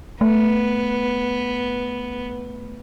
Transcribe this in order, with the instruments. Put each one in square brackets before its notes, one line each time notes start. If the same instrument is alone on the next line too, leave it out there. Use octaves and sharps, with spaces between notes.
[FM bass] A3 [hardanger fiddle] B3